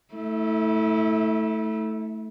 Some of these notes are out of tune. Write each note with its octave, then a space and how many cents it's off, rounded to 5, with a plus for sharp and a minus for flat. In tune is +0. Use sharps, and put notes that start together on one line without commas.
A3 +0 E4 -35